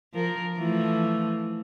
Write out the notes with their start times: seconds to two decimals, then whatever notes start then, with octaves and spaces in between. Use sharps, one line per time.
0.13 F3 A#4
0.56 E3 F3 A3